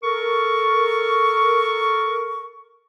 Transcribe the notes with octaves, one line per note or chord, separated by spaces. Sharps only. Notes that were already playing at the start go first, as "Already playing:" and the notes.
A4 A#4 C#6